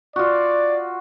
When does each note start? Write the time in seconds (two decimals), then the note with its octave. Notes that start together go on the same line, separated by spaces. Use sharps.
0.16 F4 F#4 D5